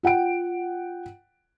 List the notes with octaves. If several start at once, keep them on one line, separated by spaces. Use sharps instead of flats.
F4 F#5 G5 D7